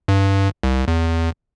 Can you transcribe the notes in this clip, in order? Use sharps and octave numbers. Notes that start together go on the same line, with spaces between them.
G2
C2
E2